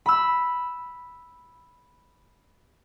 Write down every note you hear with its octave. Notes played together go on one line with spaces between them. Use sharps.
B5 E6